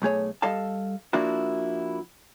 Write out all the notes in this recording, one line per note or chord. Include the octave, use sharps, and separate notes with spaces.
B1 A3 G#4 C#5
G3 A4 D#5 F5 A5
F3 A#3 D4 E4 F#4